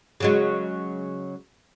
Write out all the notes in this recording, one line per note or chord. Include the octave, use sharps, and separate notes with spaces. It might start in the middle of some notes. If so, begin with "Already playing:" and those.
C#3 F#3 G#3